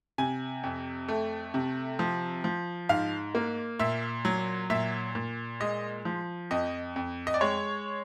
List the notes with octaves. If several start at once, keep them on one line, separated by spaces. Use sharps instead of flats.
C3 G#5
F2
A3
C3
F3
F3
G#2 F5
A#3
A#2 E5
F#3
A#2 E5
A#2
G#3 D#5
F3
F2 D#5
F2
D#5
D5
G#3 C#5